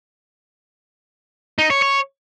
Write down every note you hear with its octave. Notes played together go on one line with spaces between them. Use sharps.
D#4
C#5
C#5